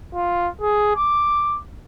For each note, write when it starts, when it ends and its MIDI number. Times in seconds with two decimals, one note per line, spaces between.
0.15 0.49 65
0.61 0.95 68
0.96 1.56 86